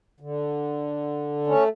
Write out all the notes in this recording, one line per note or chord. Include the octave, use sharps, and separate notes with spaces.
D3
A3 C#4